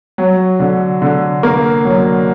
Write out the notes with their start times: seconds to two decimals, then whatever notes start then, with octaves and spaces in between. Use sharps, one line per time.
0.18 F#3
0.60 D3
1.02 D3
1.43 A#3
1.85 F#3